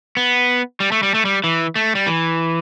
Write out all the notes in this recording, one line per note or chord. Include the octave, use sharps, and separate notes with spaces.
B3
G3
A3
G3
A3
G3
E3
A3
G3
E3